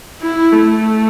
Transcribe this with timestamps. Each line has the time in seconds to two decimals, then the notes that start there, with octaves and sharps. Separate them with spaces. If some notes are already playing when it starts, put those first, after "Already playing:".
0.22 E4
0.53 A3